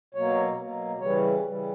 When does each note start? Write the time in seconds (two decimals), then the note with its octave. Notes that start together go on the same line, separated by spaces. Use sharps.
0.14 B2 F#3 A#3 C#5
0.57 B2 F#3 A#3
1.00 C#3 E3 G3 C#5
1.44 C#3 E3 G3